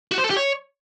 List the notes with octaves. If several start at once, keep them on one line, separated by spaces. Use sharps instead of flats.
F#4
C5
A4
G4
C#5